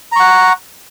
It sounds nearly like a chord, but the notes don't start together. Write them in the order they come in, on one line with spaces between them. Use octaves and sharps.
A#5 C#6 F#5